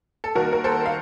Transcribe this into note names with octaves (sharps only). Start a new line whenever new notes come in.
A4
D#2 D#3 A#3 F#4 A#4
A#4
A4 C5
F5